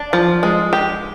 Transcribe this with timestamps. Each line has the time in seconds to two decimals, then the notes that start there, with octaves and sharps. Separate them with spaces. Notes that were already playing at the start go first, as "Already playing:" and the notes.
Already playing: D4
0.13 F3
0.43 G#3
0.73 G4